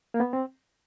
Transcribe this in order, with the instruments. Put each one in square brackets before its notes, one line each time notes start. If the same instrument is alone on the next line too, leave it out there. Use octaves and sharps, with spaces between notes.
[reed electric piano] A#3
B3
C4